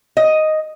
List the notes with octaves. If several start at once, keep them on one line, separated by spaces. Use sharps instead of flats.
D#5